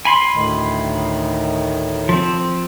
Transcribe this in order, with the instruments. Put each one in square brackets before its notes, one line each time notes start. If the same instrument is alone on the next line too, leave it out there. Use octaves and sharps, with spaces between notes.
[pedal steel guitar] G#5 B5 C6
[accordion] D2 A2 D#3
[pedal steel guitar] F3 C4